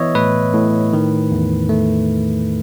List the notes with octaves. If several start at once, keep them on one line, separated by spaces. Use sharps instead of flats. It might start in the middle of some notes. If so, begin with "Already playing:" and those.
Already playing: E3 B3 C#5 D#5 E5
A2 B4
A2
D#3
E2
A3